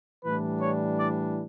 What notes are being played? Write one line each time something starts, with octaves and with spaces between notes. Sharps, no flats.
A2 E3 G3 D4 B4
C#5
D5